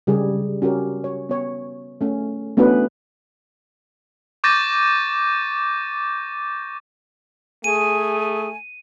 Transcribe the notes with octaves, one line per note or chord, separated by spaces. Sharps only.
C#3 G3 G4 G#4
C#4 F#4 G4 A#4
C#5
B3 C#5
A3 C#4
A3 B3 C#4 D4 F#4 B4
C#6 D6 G6 A6 A#6 D#7
A3 G#4 G#5 D#7